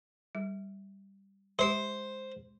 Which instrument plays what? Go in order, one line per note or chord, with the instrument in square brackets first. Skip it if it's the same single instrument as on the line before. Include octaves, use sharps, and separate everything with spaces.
[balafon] G3
[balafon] G#3 G4 [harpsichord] C5